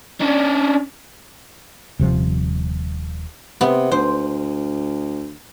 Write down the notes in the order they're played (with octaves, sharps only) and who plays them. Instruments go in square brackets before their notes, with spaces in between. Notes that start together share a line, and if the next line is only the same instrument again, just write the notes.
[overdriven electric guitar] C#4 D4
[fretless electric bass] D#1 C3 F3
[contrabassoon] C3 [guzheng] B3
[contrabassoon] D2 [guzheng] C5